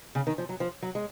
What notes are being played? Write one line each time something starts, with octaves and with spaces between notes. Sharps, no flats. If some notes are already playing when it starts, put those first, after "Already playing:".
C#3
D#3
F3
F#3
F3
F#3
G#3